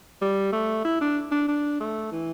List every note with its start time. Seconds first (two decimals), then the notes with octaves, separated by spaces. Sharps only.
0.22 G3
0.53 A3
0.85 E4
1.01 D4
1.32 D4
1.48 D4
1.80 A3
2.12 E3